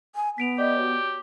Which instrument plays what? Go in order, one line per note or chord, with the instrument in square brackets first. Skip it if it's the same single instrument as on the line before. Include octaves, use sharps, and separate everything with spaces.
[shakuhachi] G#5
[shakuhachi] B3 [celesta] B6 D7 F7
[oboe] G4 [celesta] D5 D#5
[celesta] F#4 C#5